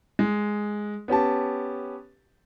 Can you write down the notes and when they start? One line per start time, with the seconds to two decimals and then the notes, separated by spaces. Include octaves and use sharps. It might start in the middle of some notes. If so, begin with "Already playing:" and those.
0.19 G#3
1.08 B3 C#4 G4 A5